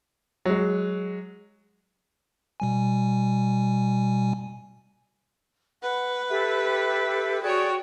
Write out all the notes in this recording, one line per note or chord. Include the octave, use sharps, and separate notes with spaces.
F#3 G#3
B2 G3 G#5
B4 F#5
G4 A4 E5
F#4 G#4 C#5 D5 G5